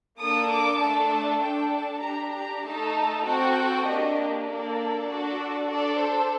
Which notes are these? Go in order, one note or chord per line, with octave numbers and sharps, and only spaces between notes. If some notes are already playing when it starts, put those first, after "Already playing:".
A#3 D4 A4 D#6
D6
A3 D4 A4 A5
A5
D4 A4 G5
A5
D4 G4 A#5
A#5
A3 D#4 A4 A5
C4 F#4 A4 G5
A#3 D4 G4 D#5
A#3 D4 A4 D5
D4 F#4 A4
D4 A4 D5
C5